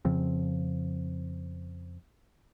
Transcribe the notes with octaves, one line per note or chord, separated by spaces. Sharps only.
F2 C#3 F3 C4